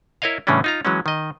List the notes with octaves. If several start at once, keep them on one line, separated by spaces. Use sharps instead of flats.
E4 A#4 C#5 D#5 F5
A2 C#3 E3 G3 C#4 D4
D#4 F4 A#5
E3 F#3 G#3 C#4
D#3 D#5